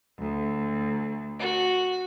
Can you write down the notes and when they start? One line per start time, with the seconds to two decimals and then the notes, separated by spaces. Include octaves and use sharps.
0.18 D2
1.38 F#4